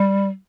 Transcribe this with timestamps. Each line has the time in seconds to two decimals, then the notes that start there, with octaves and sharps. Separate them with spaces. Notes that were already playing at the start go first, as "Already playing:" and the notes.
Already playing: G3